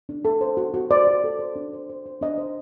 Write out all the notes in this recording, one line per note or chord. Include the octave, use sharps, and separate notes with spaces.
D4
A4
C5
F#4
F#4
C5 D5
F#4
A4
C5
D4
C5
C5
C5
D4 D#5
C5